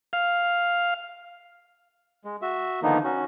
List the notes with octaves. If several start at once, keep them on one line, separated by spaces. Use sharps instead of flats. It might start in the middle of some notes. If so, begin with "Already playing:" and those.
F5
G#3
F#4 E5
D3 D#3 F3 A#3 B3 D#4
C#4 F#4